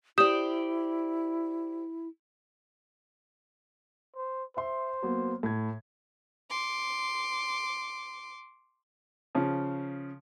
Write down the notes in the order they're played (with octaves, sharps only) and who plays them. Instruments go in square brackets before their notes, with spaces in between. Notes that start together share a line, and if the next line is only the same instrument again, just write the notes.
[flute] E4 [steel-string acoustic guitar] G4 C5 D5 [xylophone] D#6 G6 E7
[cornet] C5
[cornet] C5 [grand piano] E5 C6
[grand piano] F#3 A#3 B3
A2 G#6
[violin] C6 D6
[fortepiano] C#3 F3